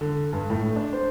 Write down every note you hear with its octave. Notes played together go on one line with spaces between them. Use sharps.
D3
G2
A2
D4
C5